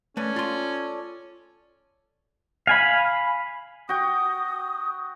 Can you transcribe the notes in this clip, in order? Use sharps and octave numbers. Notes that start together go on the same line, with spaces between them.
A3 C#4 A4 B4 C#5 D5
F4 C6
F5 G#5 B5
F#4 G5 D#6